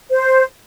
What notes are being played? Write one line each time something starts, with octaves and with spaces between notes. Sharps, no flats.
C5